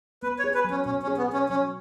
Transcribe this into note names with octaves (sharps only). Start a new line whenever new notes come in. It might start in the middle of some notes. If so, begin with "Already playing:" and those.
B3 B4
C#5
G#4
B4
F#3
C#4
B2 C#4
C#4
G#4
B3
C#4 G#4
F#3 C#4